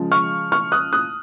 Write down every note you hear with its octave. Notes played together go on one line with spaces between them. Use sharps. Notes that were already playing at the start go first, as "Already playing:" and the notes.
Already playing: C#3 F3 G#3
C#6 F6
C#6 F6
D#6 F#6
D#6 F#6